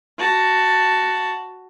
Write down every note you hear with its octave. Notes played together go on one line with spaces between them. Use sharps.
F#4 A5